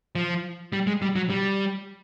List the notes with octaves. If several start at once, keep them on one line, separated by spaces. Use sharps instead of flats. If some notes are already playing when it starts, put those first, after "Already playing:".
F3
G3
G#3
G3
F#3
G3